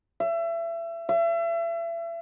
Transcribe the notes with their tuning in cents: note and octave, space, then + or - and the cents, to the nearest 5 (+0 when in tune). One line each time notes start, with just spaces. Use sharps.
E5 +30
E5 +35